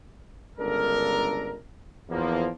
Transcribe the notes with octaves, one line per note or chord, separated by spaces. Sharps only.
G1 C#2 D4 A4 A#4
E2 F3 A#3